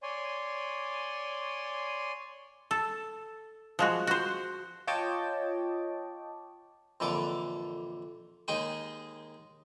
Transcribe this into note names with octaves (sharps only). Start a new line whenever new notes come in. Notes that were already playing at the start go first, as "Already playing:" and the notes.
C#5 D5 G#5 C6
A4
F3 G#3 F#4
F#4 C5
F4 C#5 D#5 G5 A5 D6
F2 A#2 D3 E3 A4 D6
D#2 G#3 D#4 G#4 G5